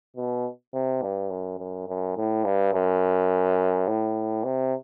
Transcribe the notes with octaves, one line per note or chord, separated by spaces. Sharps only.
B2
C3
G2
F#2
F#2
F#2
A2
G2
F#2
A2
C3